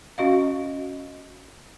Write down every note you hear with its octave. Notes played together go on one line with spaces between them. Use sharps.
C#4 F#4 D#5 F5